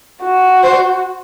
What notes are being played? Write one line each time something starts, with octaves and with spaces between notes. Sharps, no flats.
F#4
C5